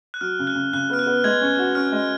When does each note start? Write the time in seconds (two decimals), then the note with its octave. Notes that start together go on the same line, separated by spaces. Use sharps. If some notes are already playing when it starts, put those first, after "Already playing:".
0.14 F#6
0.21 F#3 F6
0.39 C#3
0.47 F#6
0.55 C#3
0.73 C#3 F#6
0.90 B3 F6
0.99 F#6
1.06 B3
1.24 G#3 G#6
1.41 C#4
1.58 F#4
1.75 C#4 F6
1.92 G#3